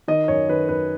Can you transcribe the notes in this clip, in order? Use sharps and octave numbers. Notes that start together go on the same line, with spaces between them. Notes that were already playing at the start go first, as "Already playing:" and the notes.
D#3 D#5
F#2 C#5
D#3 B4
F#2 B4